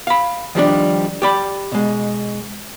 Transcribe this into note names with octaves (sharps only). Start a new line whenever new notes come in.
F5 B5
D#3 F3 G3 D4
G4 D5 B5
B2 G#3